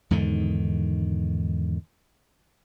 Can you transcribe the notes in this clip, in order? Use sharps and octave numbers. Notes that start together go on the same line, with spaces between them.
E2 G#2 D3 D#3